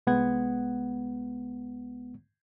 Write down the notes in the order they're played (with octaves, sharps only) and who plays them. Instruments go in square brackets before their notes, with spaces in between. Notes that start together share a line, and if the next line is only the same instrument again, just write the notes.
[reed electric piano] C2 G#3 B3 F#5 G#6